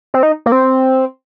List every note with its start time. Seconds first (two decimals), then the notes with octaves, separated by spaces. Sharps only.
0.14 C4
0.23 D#4
0.46 A#3
0.52 C4